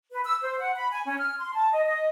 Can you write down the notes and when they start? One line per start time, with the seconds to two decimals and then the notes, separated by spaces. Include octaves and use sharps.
0.12 B4
0.25 E6
0.42 C5
0.59 F#5
0.75 B5
0.92 G#5
1.06 C#4
1.18 F6
1.39 C6
1.54 A5
1.73 D#5
1.86 D#5